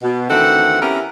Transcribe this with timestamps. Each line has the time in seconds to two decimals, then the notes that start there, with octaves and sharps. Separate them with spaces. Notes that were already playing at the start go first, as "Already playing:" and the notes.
0.03 B2
0.29 D2 D#3 E3 C4 A4 F#5
0.80 B3 C#4 E4 G4 A#4